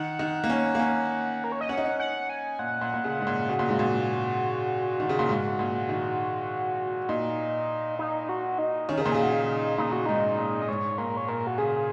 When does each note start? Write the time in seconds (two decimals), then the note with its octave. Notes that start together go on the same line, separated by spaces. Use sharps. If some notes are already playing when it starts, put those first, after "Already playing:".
Already playing: D#3 F#5
0.19 D#3
0.44 A#3
0.50 C#4
0.75 A#3
0.79 C#4
1.44 A#4
1.52 C#5
1.61 D#5
1.69 C#4 F#5
1.78 D#4
1.86 C#4
2.00 F#5
2.30 G#5
2.59 A#2 F#5
2.81 A#2
2.94 A#2
3.04 C#3
3.20 G#2
3.27 A#2
3.49 C#3 F#4
3.59 A#2
3.69 G#2
3.79 A#2
5.00 D#3
5.09 C#3
5.19 A#2
5.29 G#2
5.59 A#2
5.89 D#3
7.09 A#2 D#4
7.99 D#4
8.29 F#4
8.58 D#4
8.89 D#3 C#4
8.98 C#3
9.02 A#2 A#4
9.12 C#3 G#4
9.23 F#4
9.33 D#4
9.78 A#2 D#4
9.92 F#4
10.06 G#2 D#4
10.38 A#2
10.62 D#5
10.69 G#2 C#5
10.98 A#2 A#4
11.17 C#5
11.28 A#2 A#4
11.47 F#4
11.58 C#3 G#4